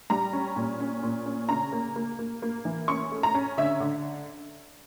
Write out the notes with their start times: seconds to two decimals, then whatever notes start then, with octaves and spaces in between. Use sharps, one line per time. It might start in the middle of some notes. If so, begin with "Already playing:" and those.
0.10 G3 A#5
0.33 C#4
0.56 A#2
0.80 C#4
1.03 A#2
1.26 C#4
1.49 C#3 A#5
1.72 A#3
1.96 A#3
2.19 A#3
2.42 A#3
2.65 E3
2.88 C#4 C#6
3.12 A3
3.23 A#5
3.34 C#4
3.57 D3 E5
3.80 D3